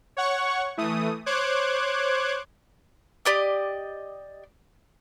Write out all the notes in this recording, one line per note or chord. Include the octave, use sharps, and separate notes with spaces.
C#5 F#5 C#6
E3 A3 D#6
C5 C#5 D6 F#6 G#6
G4 D5 D#5